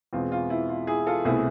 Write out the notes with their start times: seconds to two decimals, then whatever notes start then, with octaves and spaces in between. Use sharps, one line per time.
0.13 E2 B2 G#3 C4 F4
0.32 F4
0.50 E4
0.69 F4
0.87 E4 G#4
1.07 F4 A4
1.25 C2 B2 A3 C4 E4 G#4